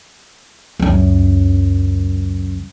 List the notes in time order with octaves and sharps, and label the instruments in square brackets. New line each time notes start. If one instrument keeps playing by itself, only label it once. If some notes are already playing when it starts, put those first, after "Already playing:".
[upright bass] C#2 F#2